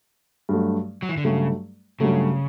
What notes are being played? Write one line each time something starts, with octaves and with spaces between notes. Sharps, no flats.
G2 F#3 A3
F#3
E3
D3
G2 C#3 F#3 A3
G2 C#3 F#3 A3